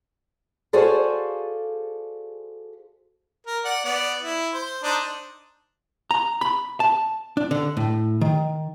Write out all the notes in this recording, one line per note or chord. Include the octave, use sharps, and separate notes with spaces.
F#4 G#4 A4 C5 D5 F5
A#4
D5 F#5
B3 D5
E4
C5
D4 D#4 C5
A#5
B5
A5
D4
D3
A2
D#3